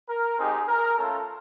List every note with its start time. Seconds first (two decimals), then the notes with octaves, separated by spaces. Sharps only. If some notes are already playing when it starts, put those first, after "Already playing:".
0.09 A#4
0.39 G#3 C4 D#4 G4 G#4
0.68 A#4
0.97 A3 C#4 F4 A4